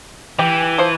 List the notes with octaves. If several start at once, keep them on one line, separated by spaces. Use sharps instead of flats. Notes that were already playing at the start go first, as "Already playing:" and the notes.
E3 G4
F3 C5